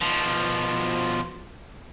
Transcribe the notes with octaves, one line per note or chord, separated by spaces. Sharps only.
B2 F3